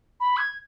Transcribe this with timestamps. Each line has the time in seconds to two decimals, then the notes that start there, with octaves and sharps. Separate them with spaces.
0.20 B5
0.37 G#6